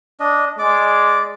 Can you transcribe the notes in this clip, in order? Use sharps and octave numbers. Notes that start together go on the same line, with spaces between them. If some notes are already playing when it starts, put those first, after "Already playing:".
D4 D#5
G#3 D5 D6